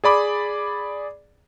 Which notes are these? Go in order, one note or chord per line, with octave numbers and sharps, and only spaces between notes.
G#4 D5 B5 D6